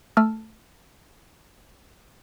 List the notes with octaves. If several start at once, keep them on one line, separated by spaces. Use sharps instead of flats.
A3 A5 E6 F6